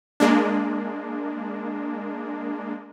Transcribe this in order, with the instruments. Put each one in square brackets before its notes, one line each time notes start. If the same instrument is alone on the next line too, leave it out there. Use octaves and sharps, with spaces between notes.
[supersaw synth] G#3 A#3 D4